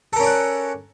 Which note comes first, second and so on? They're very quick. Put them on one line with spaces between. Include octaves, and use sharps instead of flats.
A4 A#4 C#4 D5 F#5